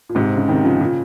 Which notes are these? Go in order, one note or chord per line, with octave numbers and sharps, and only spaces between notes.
A#2
G#2 C3
C#3
C3 D#3
C#3 F3
A#2 C#3